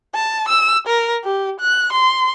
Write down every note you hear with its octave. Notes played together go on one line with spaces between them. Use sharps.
A5
E6
A#4
G4
F#6
C6